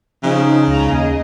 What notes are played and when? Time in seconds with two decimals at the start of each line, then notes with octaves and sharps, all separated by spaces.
0.23 C#3 F3 D#4
0.67 C#2 A#5
0.88 D#2 G#4 D#5